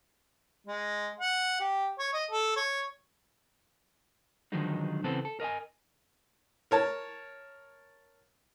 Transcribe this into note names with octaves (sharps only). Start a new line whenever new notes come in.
G#3
F#5
G4
C#5
D#5
A4
C#5
D3 D#3 F3 F#3 G#3 D#4
C#3 E3 B3 C4 A4
A4
A#4 D#5 E5 G#5
A#4 C#5 A5